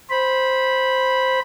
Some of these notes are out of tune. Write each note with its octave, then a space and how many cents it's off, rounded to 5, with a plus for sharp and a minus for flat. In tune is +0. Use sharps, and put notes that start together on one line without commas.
C5 +0 B5 -10